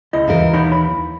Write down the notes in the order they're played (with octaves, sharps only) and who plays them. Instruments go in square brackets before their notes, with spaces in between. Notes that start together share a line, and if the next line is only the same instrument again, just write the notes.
[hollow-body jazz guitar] C#2 E4 D#5
[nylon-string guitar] D#2 E3 A#4
[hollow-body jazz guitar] D#4 C#5 B5
B5